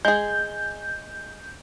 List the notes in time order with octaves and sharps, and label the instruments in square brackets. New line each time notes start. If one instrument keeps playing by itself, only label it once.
[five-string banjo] G#3 G#4 [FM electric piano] G6